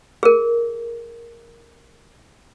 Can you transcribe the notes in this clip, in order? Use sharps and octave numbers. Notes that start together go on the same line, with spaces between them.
G#4 A#4